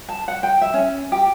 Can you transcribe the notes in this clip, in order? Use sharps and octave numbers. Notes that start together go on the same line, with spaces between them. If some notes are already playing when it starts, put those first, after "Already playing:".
A5
F#5
G5
E5
C#4
G4